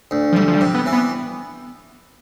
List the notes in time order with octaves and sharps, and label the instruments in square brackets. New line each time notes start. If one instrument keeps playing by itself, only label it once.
[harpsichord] D2
[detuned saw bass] F3
[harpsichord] D2 [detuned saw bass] G3
[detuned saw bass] F3
G3
[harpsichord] C3
[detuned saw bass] B3
[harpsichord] E3
[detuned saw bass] B3